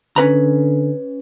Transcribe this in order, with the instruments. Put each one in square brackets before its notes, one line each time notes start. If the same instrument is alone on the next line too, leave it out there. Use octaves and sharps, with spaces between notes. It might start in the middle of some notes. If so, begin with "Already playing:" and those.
[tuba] D3 [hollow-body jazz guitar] C#4 B4 A#5